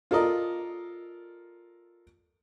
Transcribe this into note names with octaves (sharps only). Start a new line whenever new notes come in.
F4 A4 A#4 D5 D#5